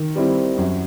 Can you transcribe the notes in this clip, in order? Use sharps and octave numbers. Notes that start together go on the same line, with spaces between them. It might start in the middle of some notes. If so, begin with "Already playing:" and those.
Already playing: D#3
G3 C4 E4
F#2